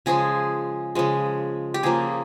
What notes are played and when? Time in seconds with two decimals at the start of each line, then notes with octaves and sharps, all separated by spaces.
0.06 C#3 F3 G#3 G#4
0.95 C#3 F3 G#3
1.74 G4
1.83 C#3 F3 A#3 G#4